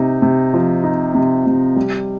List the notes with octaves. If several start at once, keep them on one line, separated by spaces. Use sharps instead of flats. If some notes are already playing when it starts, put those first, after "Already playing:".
Already playing: C3 D#4
C3
F3
D#4
C3
C3
G3